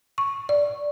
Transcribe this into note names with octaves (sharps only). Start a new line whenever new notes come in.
C#6
D5